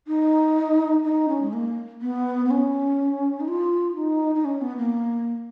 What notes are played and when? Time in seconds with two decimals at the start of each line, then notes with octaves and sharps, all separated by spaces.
0.07 D#4
1.04 D#4
1.29 C#4
1.42 G#3
1.53 A#3
2.02 B3
2.45 B3
2.51 C#4
3.40 D#4
3.48 F4
3.96 D#4
4.35 D#4
4.45 C#4
4.61 B3
4.77 A#3